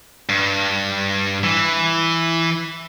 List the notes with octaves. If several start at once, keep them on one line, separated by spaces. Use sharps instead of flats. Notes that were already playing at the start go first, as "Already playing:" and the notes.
G2
E3